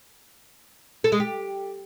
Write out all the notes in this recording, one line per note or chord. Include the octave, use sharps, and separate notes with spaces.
A4
G#3
G4